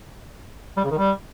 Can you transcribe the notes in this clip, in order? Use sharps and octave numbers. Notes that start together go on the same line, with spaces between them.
G3
C#3
D#3
G3